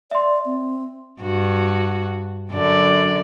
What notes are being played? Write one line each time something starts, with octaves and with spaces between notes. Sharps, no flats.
D5 E5 C6
C4
G2 F#4
F#2 D3 D5